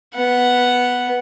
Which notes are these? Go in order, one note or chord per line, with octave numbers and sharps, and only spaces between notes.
B3 F#5